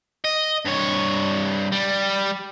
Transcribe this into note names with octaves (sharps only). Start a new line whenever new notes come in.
D#5
G2 C#5
G3